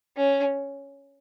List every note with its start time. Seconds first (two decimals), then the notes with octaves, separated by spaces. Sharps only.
0.17 C#4